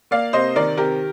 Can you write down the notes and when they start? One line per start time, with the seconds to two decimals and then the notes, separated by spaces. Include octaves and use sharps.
0.11 A#3 D5 F5
0.33 C3 C5 D#5
0.56 D#3 A#4 D5
0.77 C3 G4 A#4